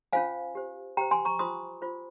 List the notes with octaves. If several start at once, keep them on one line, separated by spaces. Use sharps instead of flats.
C#4 F4 C5 F5 G#5
G4 C5
G4 C5 G5 A#5
G#5 C6
A#5 C#6
F4 C5 C6 D#6
F4 C5